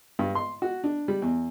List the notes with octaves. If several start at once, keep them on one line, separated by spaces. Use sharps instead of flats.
G2
C6
F#4
D4
G3
E2